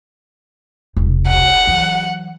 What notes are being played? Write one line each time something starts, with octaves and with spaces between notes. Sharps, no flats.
E1 C2
F#5
E3 F#3